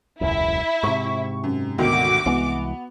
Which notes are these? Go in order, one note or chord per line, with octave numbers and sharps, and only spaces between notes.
E1 C#2 F#2 E4 E5
G#2 C3 C#6
F#2
D2 B2 D#3 F#4 D6
C2 E3 G#3 B3